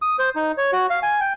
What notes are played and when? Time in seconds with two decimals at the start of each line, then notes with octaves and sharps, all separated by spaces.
0.02 D#6
0.19 C5
0.36 D#4
0.57 C#5
0.73 F#4
0.90 F5
1.03 G#5
1.21 G5